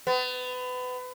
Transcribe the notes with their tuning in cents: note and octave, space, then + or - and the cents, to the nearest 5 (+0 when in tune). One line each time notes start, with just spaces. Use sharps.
B3 +30